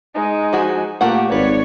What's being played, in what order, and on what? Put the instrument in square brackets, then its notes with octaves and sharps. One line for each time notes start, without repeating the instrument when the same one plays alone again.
[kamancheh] G#3 D#4
[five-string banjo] F3 F#4 G#4
[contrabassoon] A#2 [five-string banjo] A3 A#4 F#5 [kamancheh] A#3 G4
[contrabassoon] G#1 [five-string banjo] B4 [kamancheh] C#5 D5